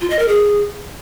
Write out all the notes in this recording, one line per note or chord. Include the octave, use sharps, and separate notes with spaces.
F4
D#5
A#4
G#4